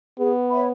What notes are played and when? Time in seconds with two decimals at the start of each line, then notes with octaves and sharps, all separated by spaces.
0.18 B3 G#4
0.50 C#5 E5 B5